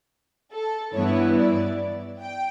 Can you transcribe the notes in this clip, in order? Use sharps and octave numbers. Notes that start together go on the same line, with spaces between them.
A4
G2 E3 B3 E4 C#5
D5
G5